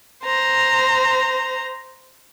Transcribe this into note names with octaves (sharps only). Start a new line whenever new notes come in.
C5 A#5